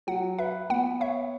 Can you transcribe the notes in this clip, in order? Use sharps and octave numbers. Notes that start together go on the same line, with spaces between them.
F#3 F#5
B4 E5
B3 F#5
C#5 E5